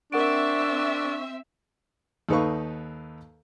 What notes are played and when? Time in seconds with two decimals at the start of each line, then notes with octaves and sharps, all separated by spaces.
0.12 C4 D4 A#4 E5 F#5 C#6 D7
2.29 D#2 D#4 A4 B4 F5 C#6